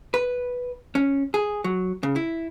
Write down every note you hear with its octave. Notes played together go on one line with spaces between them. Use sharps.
B4
C#4
G#4
F#3
C#3
E4